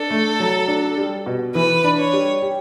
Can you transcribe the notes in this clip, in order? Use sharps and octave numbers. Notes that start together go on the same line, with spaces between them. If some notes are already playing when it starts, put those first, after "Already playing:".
Already playing: D4 A4
A3
F#3
D4
G3
B2
E3 B4
D4
C#5
G3
G4